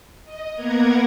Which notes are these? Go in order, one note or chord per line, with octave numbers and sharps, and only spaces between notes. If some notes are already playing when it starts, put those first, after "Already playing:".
D#5
A#3 B3 A#4 F#5 A#5 G#6